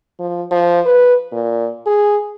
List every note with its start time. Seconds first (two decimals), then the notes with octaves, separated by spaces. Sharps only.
0.20 F3
0.51 F3
0.86 B4
1.32 A#2
1.87 G#4